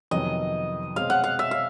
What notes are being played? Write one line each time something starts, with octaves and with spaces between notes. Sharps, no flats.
F2 C3 D#3 F#3 B3 D#5
B2 G#3 C4 F5
F#5
F5
E5
F5